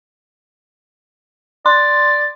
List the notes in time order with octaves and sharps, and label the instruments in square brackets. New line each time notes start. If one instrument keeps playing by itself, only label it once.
[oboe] D5 [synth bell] C6